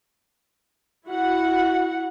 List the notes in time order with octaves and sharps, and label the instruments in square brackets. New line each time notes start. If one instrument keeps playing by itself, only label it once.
[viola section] E4 F#4 F#5